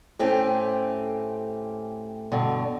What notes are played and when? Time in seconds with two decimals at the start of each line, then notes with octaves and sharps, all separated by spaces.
0.19 A2 A3 C4 C#4 G4
2.32 G2 B2 D3